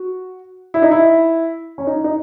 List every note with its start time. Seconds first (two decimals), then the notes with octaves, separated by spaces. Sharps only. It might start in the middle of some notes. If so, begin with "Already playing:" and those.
Already playing: F#4
0.74 E4
0.82 D#4
0.92 E4
1.78 C#4
1.87 D#4
2.04 D#4